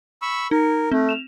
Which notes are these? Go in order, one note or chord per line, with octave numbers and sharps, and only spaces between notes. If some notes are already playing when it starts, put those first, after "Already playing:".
B5 C#6 E6
D#4 A#4
A3 C4
E7 F7